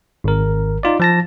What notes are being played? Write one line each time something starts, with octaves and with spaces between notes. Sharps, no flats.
G#1 A#4
D#4 F4 D5
F3 A5 A#6